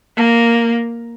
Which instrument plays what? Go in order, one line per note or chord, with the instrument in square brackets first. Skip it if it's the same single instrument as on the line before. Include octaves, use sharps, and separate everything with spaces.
[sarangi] A#3